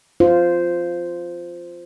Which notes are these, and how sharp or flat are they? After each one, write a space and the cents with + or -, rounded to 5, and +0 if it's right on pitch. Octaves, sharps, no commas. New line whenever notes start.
F4 +0 C5 -10